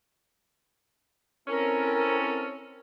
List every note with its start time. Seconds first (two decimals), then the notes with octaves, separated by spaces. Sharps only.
1.48 C4 C#4 E4 A4 A#4